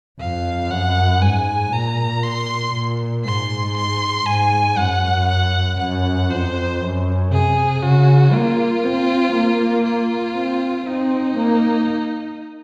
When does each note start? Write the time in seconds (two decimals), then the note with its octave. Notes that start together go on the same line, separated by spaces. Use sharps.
0.20 F2 F5
0.71 F#2 F#5
1.22 G#2 G#5
1.73 A#2 A#5
2.23 C6
2.74 A#2
3.25 G#2 C6
3.76 C6
4.26 G#2 G#5
4.77 F#2 F#5
5.29 F#5
5.79 F#2 F#5
6.30 F2 C5
6.81 F#2
7.31 C3 G#4
7.82 C#3 F#4
8.33 A#3 F4
8.84 C4
9.35 A#3
9.85 F4
10.35 C4
10.86 C4 D#4
11.37 A#3